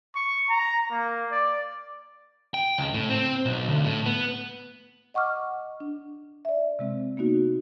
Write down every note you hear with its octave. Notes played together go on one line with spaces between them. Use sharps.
C#6
A#5
A#3
D5
G5
C#2
A2
C4
B1
D2
A2
B3
D#5 F#5 C#6 D6 F6
D4
D5 E5
C3 G#3 C4
A#3 B3 D#4 F#4